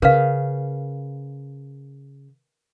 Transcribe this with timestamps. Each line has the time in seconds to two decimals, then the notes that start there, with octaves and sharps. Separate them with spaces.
0.02 C#3 A#4 B4 F5